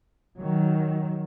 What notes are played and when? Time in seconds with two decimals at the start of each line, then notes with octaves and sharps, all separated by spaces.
0.38 D#3 F#3